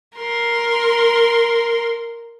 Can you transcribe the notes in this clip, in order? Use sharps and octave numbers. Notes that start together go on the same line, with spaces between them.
A#4 C6